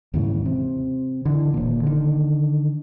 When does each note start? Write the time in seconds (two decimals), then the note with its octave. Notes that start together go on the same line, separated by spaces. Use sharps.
0.14 D#2 G#2 C#3 E3
0.45 C3
1.25 D3 E3
1.54 D#1 A#2
1.83 D3 D#3